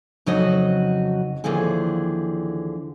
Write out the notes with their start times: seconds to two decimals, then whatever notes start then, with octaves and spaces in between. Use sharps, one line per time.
0.26 F2 C#3 F#3 D#4 F#4 D#5
1.44 D#2 D3 E3 F3 G#4